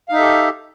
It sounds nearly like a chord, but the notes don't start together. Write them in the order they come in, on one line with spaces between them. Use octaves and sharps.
F5 D#4 E5 A4 G4